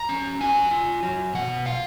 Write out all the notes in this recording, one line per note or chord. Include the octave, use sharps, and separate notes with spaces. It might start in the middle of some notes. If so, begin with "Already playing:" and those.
Already playing: A#5
C#4
F#3 G#5
F4
F#3
B2 F#5
F4 F5